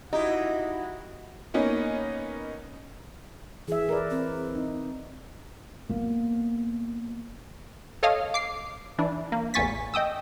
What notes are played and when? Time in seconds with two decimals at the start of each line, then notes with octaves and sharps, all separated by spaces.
0.13 D#4 E4 F#4 G4 D#5
1.54 A#3 B3 C#4 D#4
3.68 E3 G#4 E5
3.89 A#4 B4 D5
4.10 C4
4.55 D#4
5.89 A#3 B3
8.03 A4 C#5 D#5 F5 D#6
8.34 D6 C7
8.98 E3 D4
9.32 A#3
9.54 A1 E2 G#5 C#6 A6 B6
9.94 D#5 G5 D#6 E6